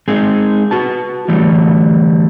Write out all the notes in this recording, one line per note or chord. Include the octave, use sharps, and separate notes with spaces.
G#3 C4 D#4 G#4
F#4 B4 A5
D3 E3 F#3 G3 A3